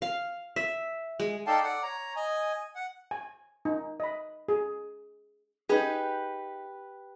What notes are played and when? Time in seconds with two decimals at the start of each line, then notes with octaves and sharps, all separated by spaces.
0.02 F5
0.56 E5
1.20 G#3
1.46 D#4 A4 D5 F5 G5 A5
1.64 D5 F#5
1.83 C#5 A#5
2.16 D#5 G#5
2.76 F#5
3.11 G#5
3.65 D#4
4.00 D#5 B5
4.49 G#4
5.69 D#4 G4 G#4 B4